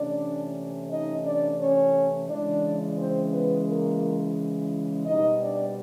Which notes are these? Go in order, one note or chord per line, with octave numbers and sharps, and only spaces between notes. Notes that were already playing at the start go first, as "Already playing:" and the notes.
Already playing: C3 E3 A3 C#4 D4 D5
D#4 D#5
D4 D5
C#4 C#5
C#3 E3 G#3 C#4 D4 D5
C4 C5
B3 B4
A#3 A#4
B2 G3 C4 D#4 D#5
D4 D5